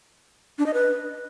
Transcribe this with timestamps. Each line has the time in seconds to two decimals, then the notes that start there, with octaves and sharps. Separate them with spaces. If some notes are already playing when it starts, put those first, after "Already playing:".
0.59 D4
0.66 D#5
0.74 B4